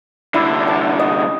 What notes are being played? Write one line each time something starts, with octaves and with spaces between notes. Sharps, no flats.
C2 D3 E4
A5
D#5